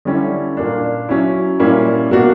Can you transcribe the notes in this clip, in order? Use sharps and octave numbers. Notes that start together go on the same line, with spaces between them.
D3 G3 C#4 E4
A#2 A#3 D4
F#3 C#4 E4
A#2 G3 A#3 C#4 E4
B2 A#3 D4 F#4